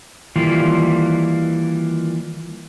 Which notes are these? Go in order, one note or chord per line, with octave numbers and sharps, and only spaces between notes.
D#3 E3 G3 A#3 F4